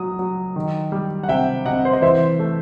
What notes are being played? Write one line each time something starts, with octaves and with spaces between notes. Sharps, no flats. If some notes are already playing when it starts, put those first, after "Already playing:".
Already playing: F#3 D#6
F#3
D#3
G3
F#5
C3 E5 G5
C3 D#5 F#5
C5
D#5
E3 C5 E5
A3